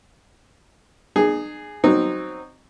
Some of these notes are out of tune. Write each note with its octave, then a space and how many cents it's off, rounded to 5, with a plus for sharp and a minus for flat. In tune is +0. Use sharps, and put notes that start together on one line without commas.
D#4 -45 G#4 +0
F#3 +0 C4 +0 D#4 -15